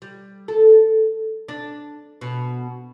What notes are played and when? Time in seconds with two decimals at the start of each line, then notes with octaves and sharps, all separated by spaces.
0.02 G3
0.48 A4
1.48 D4
2.21 B2